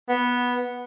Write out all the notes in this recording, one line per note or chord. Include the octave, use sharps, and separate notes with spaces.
B3